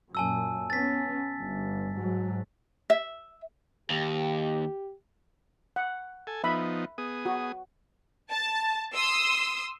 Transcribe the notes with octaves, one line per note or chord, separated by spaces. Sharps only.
F#2 A#2 G#5 A5 E6
B3 C#4 A6 B6
G1
G#2 F#3
E5
D#2 G4
F#5
A4 G#5
F3 B3 D#4 E5 B5
B3 G#4 D#6
F#4
A5
C6 D#6 E6